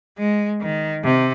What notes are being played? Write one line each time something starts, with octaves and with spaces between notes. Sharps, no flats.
G#3
D#3
C3